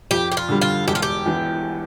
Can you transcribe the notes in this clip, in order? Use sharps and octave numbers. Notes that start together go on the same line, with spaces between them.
F2 G4
G4
F4
D3 G3
F4
E1 G4
F4
G4
E2 E3